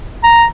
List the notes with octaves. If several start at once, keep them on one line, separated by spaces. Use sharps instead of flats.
A#5